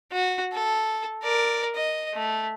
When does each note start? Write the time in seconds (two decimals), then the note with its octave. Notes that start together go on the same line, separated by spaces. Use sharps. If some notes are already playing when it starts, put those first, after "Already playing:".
0.12 F#4
0.53 A4
1.23 A#4 D5
1.75 D#5
2.14 A3